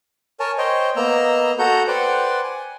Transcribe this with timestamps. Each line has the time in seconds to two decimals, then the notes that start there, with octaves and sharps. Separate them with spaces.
0.40 A#4 C#5 G#5 A5
0.58 C5 C#5 D#5 G5
0.96 A#3 B3 D#5 A#5 E6
1.59 F#4 A4 F#5 A#5 G6
1.88 B4 C5 D5 F#5 G5
2.43 G#5